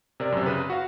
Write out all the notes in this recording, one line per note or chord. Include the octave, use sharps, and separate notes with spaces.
C3 A#4 D5
F#2 C3
C#3 B4
F#4 F5